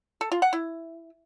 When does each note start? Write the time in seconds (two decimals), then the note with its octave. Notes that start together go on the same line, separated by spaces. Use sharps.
0.21 A4
0.32 F4
0.42 F#5
0.53 E4